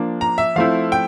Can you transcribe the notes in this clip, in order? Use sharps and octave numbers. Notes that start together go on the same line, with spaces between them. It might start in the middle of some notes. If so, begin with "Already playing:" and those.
Already playing: F3 A#3 D4
A#5
E5
F3 A3 C4 E4 F5
G5